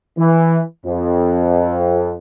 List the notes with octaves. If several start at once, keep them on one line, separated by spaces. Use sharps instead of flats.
E3
F2